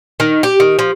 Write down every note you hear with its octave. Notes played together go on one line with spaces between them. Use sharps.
D#3
G4
D#3
F3